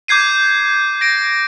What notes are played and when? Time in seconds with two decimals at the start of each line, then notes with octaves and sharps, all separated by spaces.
0.08 D6 G6 G#6 C7 D#7
1.01 A#6 D7